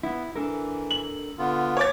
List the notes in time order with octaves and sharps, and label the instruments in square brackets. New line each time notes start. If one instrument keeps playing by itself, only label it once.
[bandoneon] B3 [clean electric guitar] E4
[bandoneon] E3 [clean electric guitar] D4 A4 A#4
[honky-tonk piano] F#7
[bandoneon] D3 B3 F4
[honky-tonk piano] C#5 D6 A6